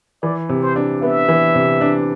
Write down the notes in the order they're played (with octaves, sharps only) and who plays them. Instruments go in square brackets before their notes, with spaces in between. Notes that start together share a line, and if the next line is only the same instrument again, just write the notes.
[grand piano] E3 [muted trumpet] D5
[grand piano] C3
[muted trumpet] C5
[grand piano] D4
[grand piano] B3 [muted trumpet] E5
[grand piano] E3
C3
D4